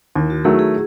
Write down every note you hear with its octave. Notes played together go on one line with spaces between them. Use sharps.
D#2 E4
F#4
D#3 F#3 A3 G#4
G#4